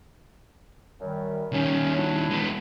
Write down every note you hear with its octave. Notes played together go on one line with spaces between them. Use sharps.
F#2 D#3 G3
D#3 G3 C#4
F#3 D4 E4
G#3 B3